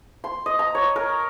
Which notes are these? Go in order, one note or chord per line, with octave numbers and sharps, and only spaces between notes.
C6
D#5
A#5
C#5
A#4